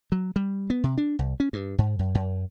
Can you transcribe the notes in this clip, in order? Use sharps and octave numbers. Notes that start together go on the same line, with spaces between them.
F#3
G3
B3
C3
D4
C2
C#4
G2
G#2
F#2
F#2